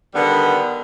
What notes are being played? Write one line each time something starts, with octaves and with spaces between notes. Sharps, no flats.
D3 D#3 G3 B3